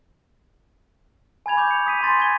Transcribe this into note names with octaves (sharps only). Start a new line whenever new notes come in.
G#5 B5 G#6 F7
C#6 D6 G6
C#7 F7
D#6 B6 D#7
G#5 C6 A6 B6
G#5 G#6 D#7 G7